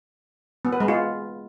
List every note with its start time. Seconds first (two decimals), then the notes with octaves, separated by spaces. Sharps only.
0.65 B3
0.73 B4
0.80 G#3
0.88 F4